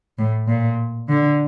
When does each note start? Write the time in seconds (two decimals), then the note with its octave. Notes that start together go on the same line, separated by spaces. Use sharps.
0.18 A2
0.47 A#2
1.09 D3